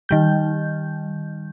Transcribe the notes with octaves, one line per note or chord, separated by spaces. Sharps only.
D#3 G3 G6